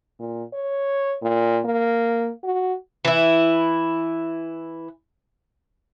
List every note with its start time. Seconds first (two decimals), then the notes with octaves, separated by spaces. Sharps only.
0.20 A#2
0.54 C#5
1.22 A#2
1.65 A#3
2.44 F#4
3.05 E3 E4